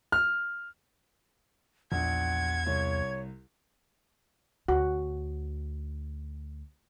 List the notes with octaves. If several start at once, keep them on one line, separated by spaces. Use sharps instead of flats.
F6
A#1 E2 F#5 G#6
C2 C#5
D2 F#4